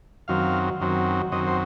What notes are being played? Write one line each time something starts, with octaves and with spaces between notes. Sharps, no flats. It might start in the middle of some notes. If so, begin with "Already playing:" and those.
F#2 D#3 F#3 C4 F5
F#2 D#3 F#3 C4
F#2 D#3 F#3 C4 D#5
C5